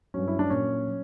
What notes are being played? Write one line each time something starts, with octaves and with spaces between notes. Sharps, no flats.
G2 F#3 C#4
E4
D4
A#2 F#3 C#4
F#3